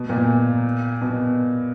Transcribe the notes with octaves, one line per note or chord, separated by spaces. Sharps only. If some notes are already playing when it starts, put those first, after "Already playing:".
Already playing: B2
A#2
B2